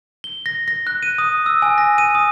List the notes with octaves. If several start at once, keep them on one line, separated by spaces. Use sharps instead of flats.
G7
A#6
A#6
F#6
D#7
D#6
E6
G#5
A#6
D#7
D#6